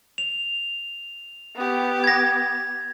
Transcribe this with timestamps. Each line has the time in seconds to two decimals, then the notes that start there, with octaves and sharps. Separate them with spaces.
0.18 F7
1.56 B3 G4
2.04 G#6 A#6